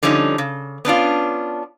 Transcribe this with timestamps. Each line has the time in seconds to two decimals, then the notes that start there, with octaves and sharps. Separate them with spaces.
0.03 D3 F3 G3 C#4 D#4
0.38 C#3
0.85 B3 C#4 D4 F4